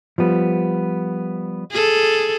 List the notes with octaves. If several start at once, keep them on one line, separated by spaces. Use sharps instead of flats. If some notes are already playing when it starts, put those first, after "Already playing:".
F3 G3 B3
G#4 A4